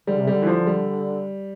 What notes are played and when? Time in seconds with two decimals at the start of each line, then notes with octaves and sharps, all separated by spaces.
0.07 D3 G3
0.19 C3
0.27 D3 G3
0.42 E3
0.47 F3
0.67 G3